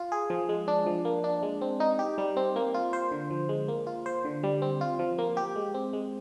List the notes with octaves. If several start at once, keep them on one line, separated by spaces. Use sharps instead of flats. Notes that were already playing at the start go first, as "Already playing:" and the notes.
Already playing: F4
G#4
F3
G#3
D4
F3
A#3
D4
G#3
C4
D#4
G4
G3
C4
A#3
F4
C5
D3
F3
G#3
A#3
F4
C5
D3
G3
C4
F4
F3
A#3
G4
G#3
C4
G#3